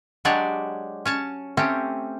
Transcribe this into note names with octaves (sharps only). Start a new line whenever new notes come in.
F#3 G#3 D4 G4 C#5 D5
C#4 C#5 A5
A3 C4 C#4 G4